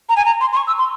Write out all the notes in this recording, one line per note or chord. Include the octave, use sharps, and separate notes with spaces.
A#5
G#5
A#5
C6
C6
C#6
E6
C6